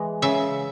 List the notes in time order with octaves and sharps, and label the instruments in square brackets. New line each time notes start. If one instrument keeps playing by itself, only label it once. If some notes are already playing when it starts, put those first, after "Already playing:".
Already playing: [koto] E3 G#3
C#3 E5